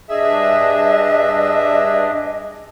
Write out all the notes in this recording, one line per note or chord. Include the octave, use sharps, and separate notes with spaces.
G2 D4 G#4 D#5 E5